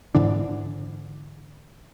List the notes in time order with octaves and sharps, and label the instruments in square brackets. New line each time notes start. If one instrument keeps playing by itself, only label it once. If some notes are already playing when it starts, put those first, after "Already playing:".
[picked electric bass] G#2 D3 E3 D4